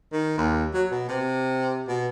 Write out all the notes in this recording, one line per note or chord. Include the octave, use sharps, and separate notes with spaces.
D#3
D#2
F#3
B2
C3
B2